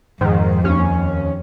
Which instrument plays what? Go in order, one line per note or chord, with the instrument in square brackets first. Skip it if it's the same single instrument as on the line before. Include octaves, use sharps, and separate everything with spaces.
[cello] F2 [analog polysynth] G#2 D#3
[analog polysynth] D#2 C#4